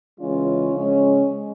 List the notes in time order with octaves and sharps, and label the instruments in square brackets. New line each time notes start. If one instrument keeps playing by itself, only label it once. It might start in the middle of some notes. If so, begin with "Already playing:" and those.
[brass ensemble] C#3 E3 G#3 C#4 F4
C#3 F3 G#3 C#4
G#3